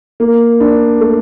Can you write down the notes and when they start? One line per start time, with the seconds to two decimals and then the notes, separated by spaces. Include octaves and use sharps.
0.20 A#3
0.60 D4
1.01 A3